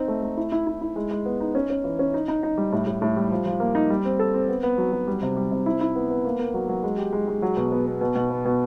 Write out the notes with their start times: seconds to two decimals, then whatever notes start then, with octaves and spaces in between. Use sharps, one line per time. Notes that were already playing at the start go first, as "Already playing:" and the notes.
Already playing: C4 D#4
0.08 A3
0.23 A3
0.37 E4
0.52 E4
0.67 E4
0.81 E4
0.96 G#3
1.11 G#3
1.25 B3
1.40 D#4
1.55 C#4
1.70 C#4
1.84 E3
1.99 C#4
2.14 D#4
2.28 D#4
2.43 D#4
2.58 G3
2.72 A2
2.87 A2
3.02 A2
3.16 G3
3.31 F3
3.46 F3
3.60 A#3
3.75 D#4
3.90 G3
4.05 C4
4.19 A4
4.34 C4
4.48 B3
4.63 B3
4.78 F#3
4.92 F#3
5.07 G3
5.22 C3
5.37 G3
5.51 C3
5.66 E4
5.81 E4
5.96 B3
6.10 B3
6.25 A#3
6.39 A#3
6.54 F#3
6.69 F#3
6.83 G#3
6.98 G4
7.12 G#3
7.28 G#3
7.42 F#3
7.57 B2
7.72 B3
7.86 B3
8.01 B2
8.15 B2
8.30 B3
8.45 B2